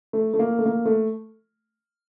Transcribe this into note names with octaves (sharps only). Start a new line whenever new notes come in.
A3
A3
A#3
A3
A#3
A3